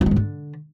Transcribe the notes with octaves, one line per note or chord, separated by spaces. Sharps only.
F3
G#3
G#2
D3